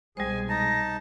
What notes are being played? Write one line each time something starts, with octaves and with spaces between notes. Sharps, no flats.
C2 B2 G3 G#3 G#4 C5 G#5
D#4 A5 A#6